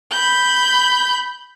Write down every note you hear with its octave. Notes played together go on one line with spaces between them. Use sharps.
B5 G6